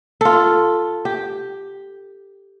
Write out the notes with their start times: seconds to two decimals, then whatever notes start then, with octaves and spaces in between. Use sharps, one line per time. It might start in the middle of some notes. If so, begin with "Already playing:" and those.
0.21 F4 A4
1.05 G4